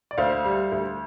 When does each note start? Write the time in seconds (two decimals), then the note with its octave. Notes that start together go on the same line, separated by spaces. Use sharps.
0.11 D5
0.18 D2 C5 F5
0.45 G3
0.72 D2